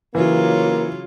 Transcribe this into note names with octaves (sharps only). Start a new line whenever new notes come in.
C#3 E3 F#3 A#3 F4